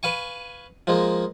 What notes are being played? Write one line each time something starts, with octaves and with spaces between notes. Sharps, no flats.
B4 F5 G#5 C#6
F3 G#3 A#3